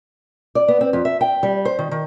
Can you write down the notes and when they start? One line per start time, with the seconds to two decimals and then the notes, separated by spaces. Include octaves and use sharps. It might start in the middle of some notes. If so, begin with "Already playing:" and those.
0.55 D5
0.68 B3
0.81 C4
0.93 F2
1.05 E5
1.21 G5
1.43 G3
1.65 C5
1.79 D#3
1.91 D#3